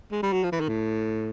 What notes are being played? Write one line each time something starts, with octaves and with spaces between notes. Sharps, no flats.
G#3
G3
F#3
F3
E3
D#3
A2